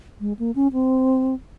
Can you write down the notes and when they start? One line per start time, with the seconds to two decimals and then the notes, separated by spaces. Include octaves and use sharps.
0.21 G#3
0.39 A#3
0.55 C#4
0.73 C4